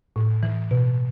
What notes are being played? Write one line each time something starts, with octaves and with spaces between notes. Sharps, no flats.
A2
E3
B2